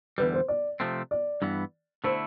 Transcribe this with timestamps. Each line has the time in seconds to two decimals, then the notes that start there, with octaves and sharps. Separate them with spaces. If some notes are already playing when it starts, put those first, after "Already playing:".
0.18 E2 D3 G3 B4
0.34 C5
0.48 D5
0.80 C3 F3 A3 C4
1.11 D5
1.42 G2 E3 B3
2.04 D3 A3 E4 C5